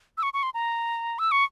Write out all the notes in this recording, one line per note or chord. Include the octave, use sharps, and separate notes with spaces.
E6
C#6
C#6
C6
A#5
E6
C#6